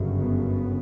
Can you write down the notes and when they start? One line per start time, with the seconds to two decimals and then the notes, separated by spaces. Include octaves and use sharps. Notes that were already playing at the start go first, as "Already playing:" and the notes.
Already playing: G1 F#2 C#3
0.18 B3